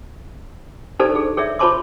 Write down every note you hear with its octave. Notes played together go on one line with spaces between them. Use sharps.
D4 D#4 G4 A4 C5 D5
G#4
G#4 C#5 D5 E5
F4 C5 C#5 A5 C6 D6